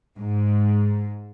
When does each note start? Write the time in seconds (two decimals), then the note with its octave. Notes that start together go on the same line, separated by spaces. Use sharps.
0.19 G#2